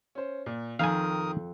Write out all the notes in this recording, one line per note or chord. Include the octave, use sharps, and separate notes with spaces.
C#4 C5
A#2
F2 D#3 A#4 F5 G#5 D#6